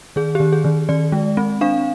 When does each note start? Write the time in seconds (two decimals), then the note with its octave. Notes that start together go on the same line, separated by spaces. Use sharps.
0.16 D#3 G#4
0.35 D#3 G4
0.53 G#4
0.65 D#3
0.89 D#3 D5
1.12 G#3
1.37 C4
1.61 D4 F5